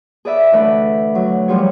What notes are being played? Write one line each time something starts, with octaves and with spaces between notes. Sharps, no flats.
G#4 B4 D5 E5
D2 E3 A3 B4 D5
F#3
F3 G3 F4 G#4 C#5